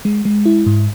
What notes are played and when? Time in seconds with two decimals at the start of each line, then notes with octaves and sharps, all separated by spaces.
0.05 G#3
0.25 G#3
0.46 E4
0.66 G#2